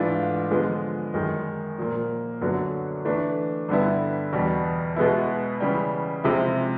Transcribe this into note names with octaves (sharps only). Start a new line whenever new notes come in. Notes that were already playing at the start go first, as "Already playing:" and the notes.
Already playing: G#2 E3 A3 D4 F4
D3 F3 G#3 B3
F#2 D#3 G#3
A#2 F3 A#3
F#2 D3 F#3 B3 D4
E3 A3 D4
G2 D3 G3 B3 E4
E2 B2 G3
B2 G#3 B3 E4
C#3 E3 G3
C3 F3 G#3 C4 E4